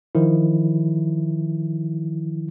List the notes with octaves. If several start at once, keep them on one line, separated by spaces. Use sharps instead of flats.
D#3 F3 E4